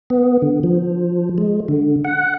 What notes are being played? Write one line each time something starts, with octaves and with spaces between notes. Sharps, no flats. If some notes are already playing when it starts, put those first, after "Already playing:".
B3
D3
F3
G#3
D3
F#5